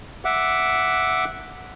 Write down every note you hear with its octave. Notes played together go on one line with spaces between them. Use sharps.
E5 F#5 D6